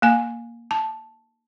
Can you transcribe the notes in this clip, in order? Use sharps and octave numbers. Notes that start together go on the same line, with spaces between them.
A#3 G#5
A5